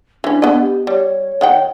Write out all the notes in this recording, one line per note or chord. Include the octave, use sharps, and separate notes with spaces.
E3 C#4 D4
B3 D#5
G4
G3 C#5
D#3 F#5 G5